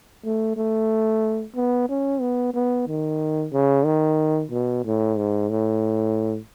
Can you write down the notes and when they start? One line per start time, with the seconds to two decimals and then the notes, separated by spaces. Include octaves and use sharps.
0.24 A3
0.56 A3
1.55 B3
1.89 C#4
2.21 B3
2.54 B3
2.88 D#3
3.52 C#3
3.85 D#3
4.52 B2
4.85 A2
5.17 G#2
5.50 A2